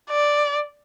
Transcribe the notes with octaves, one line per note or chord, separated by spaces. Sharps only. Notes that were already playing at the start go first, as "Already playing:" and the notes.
D5